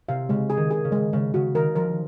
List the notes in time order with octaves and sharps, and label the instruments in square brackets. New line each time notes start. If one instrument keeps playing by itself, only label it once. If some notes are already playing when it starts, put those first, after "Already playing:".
[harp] C3 [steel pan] F5
[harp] C#3 [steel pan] G#3
[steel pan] G#4
[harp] D#3
[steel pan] G#4
[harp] C#3
[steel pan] G#3
[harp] C#3 [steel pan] G#3
[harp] C#3 [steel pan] F#4
[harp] D#3 [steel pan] A#4
[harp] F3 [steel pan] A#4